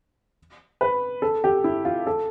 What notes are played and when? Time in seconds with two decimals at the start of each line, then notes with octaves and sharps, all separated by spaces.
0.81 B4
1.22 A4
1.44 G4
1.64 E4
1.85 F4
2.07 A4